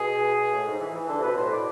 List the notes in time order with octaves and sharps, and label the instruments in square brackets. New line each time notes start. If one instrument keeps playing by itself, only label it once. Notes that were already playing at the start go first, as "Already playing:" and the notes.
Already playing: [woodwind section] B2 [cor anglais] G#4
[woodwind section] A2
G#2
E3
E3
[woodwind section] D3 [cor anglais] A4
[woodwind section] C3
[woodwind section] B2 [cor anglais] B4
[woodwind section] A2 [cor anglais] C5
[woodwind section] B2 [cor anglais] D5